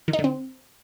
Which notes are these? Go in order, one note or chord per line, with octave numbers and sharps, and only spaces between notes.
D#3
D#4
D3
C4